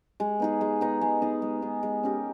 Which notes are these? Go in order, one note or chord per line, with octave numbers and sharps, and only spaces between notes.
G#3
B3 D#4 G#4
G#3
B3 D#4 G#4
G#3
B3 D#4 G#4
G#3
B3 D#4 G#4
G#3
C#4 G4 A#4